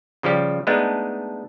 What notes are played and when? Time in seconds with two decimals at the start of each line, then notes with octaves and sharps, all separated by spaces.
0.23 C#3 F3 G3 G4
0.67 G#3 A3 B3 D4 D#4